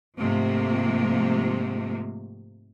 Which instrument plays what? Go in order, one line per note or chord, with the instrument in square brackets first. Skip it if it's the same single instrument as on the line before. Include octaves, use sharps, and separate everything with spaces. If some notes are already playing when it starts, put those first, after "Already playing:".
[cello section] G#2 C3 F3 A3 A#3